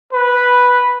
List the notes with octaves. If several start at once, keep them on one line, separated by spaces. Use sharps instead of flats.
B4